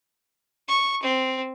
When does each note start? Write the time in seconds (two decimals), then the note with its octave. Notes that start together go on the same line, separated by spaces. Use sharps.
0.68 C#6
1.02 C4